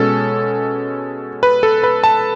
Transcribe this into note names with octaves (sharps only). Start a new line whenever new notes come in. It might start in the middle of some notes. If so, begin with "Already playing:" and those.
Already playing: B2 G#3 C#4 A4
B4
A4
B4
A5